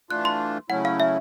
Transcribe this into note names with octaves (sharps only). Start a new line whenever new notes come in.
E3 A3 D4 F4 F#6
C6
C#3 F#3 A3 C#4 E4 F#5
F5
E5